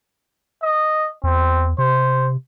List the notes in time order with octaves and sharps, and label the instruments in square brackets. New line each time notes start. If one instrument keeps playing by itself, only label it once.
[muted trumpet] D#5
[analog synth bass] E2 [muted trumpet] C4
[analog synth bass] C3 [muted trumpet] C5